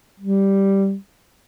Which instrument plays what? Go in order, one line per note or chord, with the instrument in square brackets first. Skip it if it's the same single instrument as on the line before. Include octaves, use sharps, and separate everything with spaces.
[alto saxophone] G3